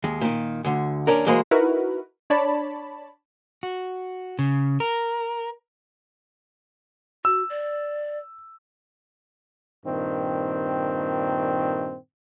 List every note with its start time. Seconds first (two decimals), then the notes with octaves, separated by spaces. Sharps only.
0.04 D#2 G#3
0.21 A#2 D#3
0.65 D2 D3
1.07 D#2 C#4 D4 A#4
1.26 E3 F#3 G#3 A#3 C5 D#5
1.51 D#4 E4 F#4 A#4 B4
2.30 D4 C#5 D5 A5 B5
3.63 F#4
4.39 C#3
4.80 A#4
7.25 F#4 E6
7.50 D5
9.85 G2 A#2 D#3 C4